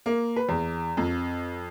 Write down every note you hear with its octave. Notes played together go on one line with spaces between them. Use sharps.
A#3
B4
E2
F2